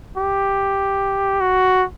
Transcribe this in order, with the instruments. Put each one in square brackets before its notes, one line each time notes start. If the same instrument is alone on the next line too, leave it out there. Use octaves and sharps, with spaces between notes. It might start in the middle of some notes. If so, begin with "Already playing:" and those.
[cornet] G4
F#4